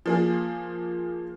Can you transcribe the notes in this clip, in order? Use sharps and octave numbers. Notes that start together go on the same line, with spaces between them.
F3 A#3 G#4